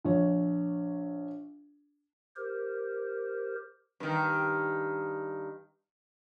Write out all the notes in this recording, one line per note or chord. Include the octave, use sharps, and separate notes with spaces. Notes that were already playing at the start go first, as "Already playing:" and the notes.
A#1 C#5
G4 A#4 C5
G2 D#3